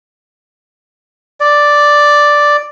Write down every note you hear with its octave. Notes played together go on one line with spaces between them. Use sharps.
D5